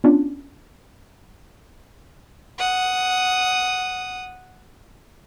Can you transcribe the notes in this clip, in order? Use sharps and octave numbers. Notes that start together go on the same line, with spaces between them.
B3 C#4 D4 F4
F#5 D#6